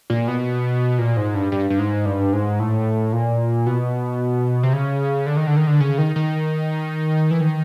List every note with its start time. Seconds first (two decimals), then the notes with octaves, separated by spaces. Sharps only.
0.10 A#2
0.28 B2
0.99 A#2
1.17 G#2
1.34 G2
1.52 G2
1.70 G2
1.79 G#2
2.06 G2
2.33 G#2
2.59 A2
3.13 A#2
3.66 B2
4.63 C3
4.73 C#3
5.26 D3
5.37 D#3
5.47 D3
5.56 D#3
5.67 D3
5.80 C#3
5.98 D#3
6.16 D#3
7.31 E3
7.41 D#3